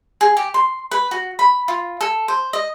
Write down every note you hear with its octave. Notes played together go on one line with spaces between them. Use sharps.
G#4
G4
C6
B4
F#4
B5
F4
A4
C5
D#5